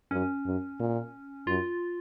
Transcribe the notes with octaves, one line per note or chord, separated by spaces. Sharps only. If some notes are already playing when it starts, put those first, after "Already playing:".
F#2 C#4
F#2
A#2
F#2 F4